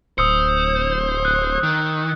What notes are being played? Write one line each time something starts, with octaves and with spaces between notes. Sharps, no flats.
D1 C5 D#6 E6 C#7
F#6
D#3